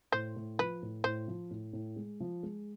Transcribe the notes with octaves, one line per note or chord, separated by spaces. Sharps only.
A2 C5
A2
F3 B4
A2
A2 C5
F3
A2
A2
G#3
F3
G#3